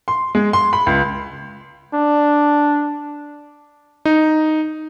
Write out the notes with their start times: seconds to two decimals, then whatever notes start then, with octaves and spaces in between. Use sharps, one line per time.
0.08 C6
0.35 G#3
0.53 C6
0.73 B5
0.86 C#2
1.94 D4
4.05 D#4